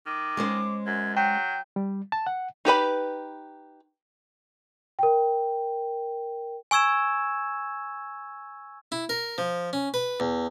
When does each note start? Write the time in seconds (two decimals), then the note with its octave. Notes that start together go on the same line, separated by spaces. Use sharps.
0.07 D#3 D6
0.37 G#3 C#4 C5
0.86 F#2 G#6
1.16 F#3 G5 G6
1.76 G3
2.12 A5
2.27 F#5
2.65 D#4 G4 B4 B5
4.99 A#4 G5
6.71 G#5 C#6 E6 G#6 E7
8.92 E4
9.09 A#4
9.38 F3
9.73 C#4
9.94 B4
10.20 E2